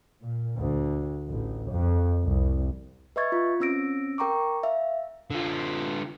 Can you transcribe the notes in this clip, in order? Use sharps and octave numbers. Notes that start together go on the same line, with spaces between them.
A#2
D2
A1
F2
C2
B4 D#5 E5 C#6 G#6 A6
F4
C4 C#4 E6 A#6 D7
A#4 G5 A#5 C#6 D6
E5 F5
D3 F4